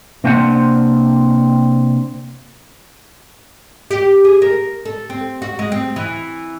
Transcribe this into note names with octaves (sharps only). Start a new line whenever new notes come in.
C3 A#3 C4 D4 C5 F#5
G4
G#4
A#4
A4
C4
F#4
G#3
C4
E3